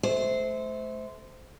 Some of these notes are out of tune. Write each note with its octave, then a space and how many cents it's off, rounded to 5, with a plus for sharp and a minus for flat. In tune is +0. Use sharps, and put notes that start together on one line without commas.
A3 -25 C5 -15